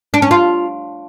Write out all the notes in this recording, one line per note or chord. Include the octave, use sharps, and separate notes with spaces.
D4
C#4
F4